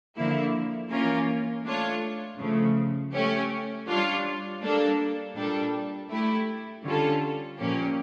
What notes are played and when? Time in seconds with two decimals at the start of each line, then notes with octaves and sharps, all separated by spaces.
0.16 D3 F3 A#3 E4
0.90 E3 A#3 C#4 F4 A#4
1.64 A3 D4 F4 C#5
2.38 C#3 F3 A3
3.13 A3 C#4 G4
3.87 G3 D4 F4 C#5
4.61 G3 A#3 D4 A4
5.36 A#2 G3 D4 A4
6.10 A3 E4 G4
6.84 D3 G3 C#4 F4 A4
7.58 A#2 F3 A#3 C#4 G4